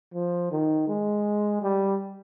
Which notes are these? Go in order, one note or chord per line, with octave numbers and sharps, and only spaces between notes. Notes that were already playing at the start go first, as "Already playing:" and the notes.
F3
D#3
G#3
G3